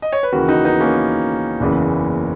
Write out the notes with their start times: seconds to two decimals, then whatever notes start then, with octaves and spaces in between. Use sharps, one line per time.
0.02 D#5
0.12 C#5
0.23 B4
0.32 D#2 C#3 E3 F#4 A#4
0.49 D#4 F#4
0.64 B3 D#4
0.80 A#3 C#4
1.60 F#1 E2 C#3 E3